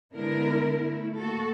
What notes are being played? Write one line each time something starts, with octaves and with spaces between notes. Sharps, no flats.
D3 G#3 B3 E4 A#4
A3 E4
A#3 F#4 A4